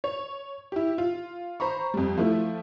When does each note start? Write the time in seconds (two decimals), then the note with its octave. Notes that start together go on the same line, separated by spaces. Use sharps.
0.04 C#5
0.72 E4 G4
0.98 F4
1.60 C5 A#5 B5 C#6
1.94 F2 G3
2.17 F3 A3 E4